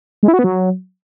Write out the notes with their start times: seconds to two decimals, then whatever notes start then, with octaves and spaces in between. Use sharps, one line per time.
0.23 G#3
0.28 E4
0.34 F#4
0.39 B3
0.44 F#3